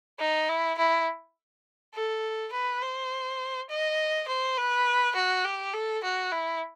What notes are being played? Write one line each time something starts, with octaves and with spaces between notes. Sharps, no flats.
D#4
E4
E4
A4
B4
C5
D#5
C5
B4
F#4
G4
A4
F#4
E4